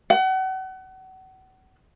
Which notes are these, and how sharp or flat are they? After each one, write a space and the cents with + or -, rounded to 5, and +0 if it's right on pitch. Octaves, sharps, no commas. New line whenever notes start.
F#5 +35